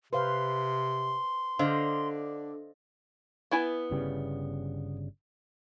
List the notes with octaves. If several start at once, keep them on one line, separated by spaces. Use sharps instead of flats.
C3 B4 C5 F5 C6
D3 D4 C5 D#5 F5
B3 E4 G#5
G1 C#3 G3